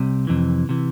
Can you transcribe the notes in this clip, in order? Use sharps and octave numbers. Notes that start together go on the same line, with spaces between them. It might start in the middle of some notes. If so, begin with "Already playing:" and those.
Already playing: C2 C3
F2 C3 E3
C3 E3